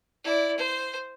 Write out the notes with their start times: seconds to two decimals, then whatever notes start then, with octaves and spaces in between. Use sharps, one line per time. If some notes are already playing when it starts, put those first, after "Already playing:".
0.24 E4 D5
0.57 C5